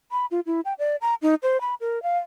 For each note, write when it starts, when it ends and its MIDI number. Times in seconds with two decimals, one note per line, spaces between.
0.12 0.26 83
0.31 0.40 65
0.46 0.61 64
0.65 0.74 79
0.79 0.96 74
1.01 1.15 82
1.22 1.35 63
1.43 1.60 72
1.61 1.75 83
1.81 2.02 70
2.03 2.18 77